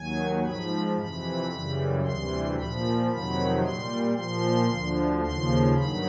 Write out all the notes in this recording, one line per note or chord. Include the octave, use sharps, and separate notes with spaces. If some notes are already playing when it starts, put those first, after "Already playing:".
Already playing: D#2 D#3 F#3 G#5
G#2 F3 B5
F2 C3 E3 B5
F#2 C#3 E3 G3
D2 C3 E3 G3 C6
A#2 F3 B5
F2 C3 D#3 F#3 B5
A#2 G3 C6
A#2 F3 C6
D2 D3 F3
D#2 C#3 F3 C6
G2 D#3 F#3 B5